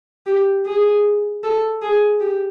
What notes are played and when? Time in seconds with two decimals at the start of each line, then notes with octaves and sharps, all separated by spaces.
0.27 G4
0.66 G#4
1.44 A4
1.82 G#4
2.20 G4